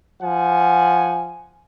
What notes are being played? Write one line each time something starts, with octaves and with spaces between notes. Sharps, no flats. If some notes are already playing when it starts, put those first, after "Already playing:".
F3 F#5 G#5